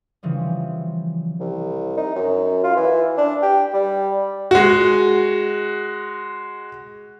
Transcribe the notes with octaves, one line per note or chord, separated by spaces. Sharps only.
C#3 E3 F3 G3
C2
D#4
F#2
F4
E3
D4
G4
G3
G#3 F#4